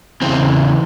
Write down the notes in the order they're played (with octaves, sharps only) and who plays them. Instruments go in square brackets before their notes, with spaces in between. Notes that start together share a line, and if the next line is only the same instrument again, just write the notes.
[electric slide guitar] E2 C#3 E3 C4